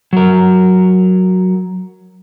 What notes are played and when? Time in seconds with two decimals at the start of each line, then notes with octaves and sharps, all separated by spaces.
0.13 F#3 A#4